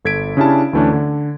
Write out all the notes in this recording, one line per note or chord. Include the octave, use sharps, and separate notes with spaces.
G1 A4 G#6 B6 D7
C#3 C#4 D4 E4 G4 A5
D2 E3 A3 C#4 D4
D3